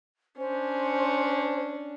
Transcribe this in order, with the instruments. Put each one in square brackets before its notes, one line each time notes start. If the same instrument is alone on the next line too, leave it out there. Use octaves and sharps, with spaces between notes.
[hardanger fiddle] C#4 D4 [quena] C5